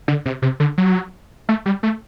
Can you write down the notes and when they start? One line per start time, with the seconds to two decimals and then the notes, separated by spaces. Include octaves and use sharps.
0.08 D3
0.26 C3
0.42 C3
0.60 D3
0.78 F#3
1.49 A3
1.66 G3
1.83 A3